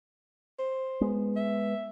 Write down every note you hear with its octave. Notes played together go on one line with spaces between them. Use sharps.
C5
G#3 B3
E5